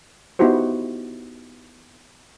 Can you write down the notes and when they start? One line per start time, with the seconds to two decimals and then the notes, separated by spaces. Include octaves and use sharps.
0.39 B3 D#4 E4 F#4 G4 C5